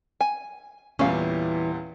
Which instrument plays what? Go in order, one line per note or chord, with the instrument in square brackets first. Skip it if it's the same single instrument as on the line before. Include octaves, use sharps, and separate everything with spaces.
[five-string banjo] G#5
[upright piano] E2 A#2 G3 [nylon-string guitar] E3 [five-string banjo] C#4 F5